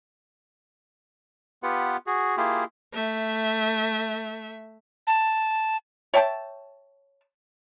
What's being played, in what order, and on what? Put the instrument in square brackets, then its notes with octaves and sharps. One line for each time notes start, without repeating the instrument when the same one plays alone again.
[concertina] B3 F4 G4 B4 F#5
F#4 G#4
A#3 E4 F4 G4 G#4
[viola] A3 E5
[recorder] A5
[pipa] C#5 E5 G5 A5